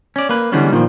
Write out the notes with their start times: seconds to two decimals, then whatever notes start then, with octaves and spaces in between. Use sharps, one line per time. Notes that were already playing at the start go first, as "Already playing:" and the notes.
0.16 C#4 D5
0.29 A#3 B4
0.52 D3 E3 G3 G#3 B3 C#4
0.72 A#2 D#3 F3